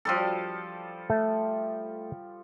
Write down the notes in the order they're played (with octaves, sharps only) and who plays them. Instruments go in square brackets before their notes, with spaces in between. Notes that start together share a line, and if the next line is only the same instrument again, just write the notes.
[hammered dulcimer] F3 G3 A4
[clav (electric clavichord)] A3